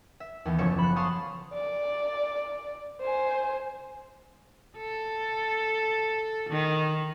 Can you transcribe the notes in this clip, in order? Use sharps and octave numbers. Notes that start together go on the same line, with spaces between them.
E5
D#2 E3 B3
F#1 F3 A4 C#5 C#7 E7
B5 F#6
F5 A5 C6 C#6 D#6 G6
D5
C5 G#5
A4
D#3